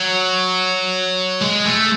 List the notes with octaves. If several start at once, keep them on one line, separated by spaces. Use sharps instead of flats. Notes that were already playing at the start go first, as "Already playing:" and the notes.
Already playing: F#3
G#3
A3